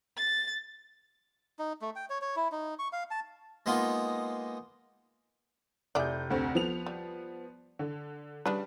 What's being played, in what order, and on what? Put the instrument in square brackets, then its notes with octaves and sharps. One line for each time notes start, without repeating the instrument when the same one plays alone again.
[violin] A6
[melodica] D#4
A3
G5
C#5
C#5
E4
D#4
C#6
F5
A5
[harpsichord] G#3 A#3 B3 D#4 F4
[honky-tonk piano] F1 G6 [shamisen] E4 G#4 D5
[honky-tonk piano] F1 D2 C4
F3 B3 F7
[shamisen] G3
[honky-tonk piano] D3
[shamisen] C#3 D4 B4 [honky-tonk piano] G3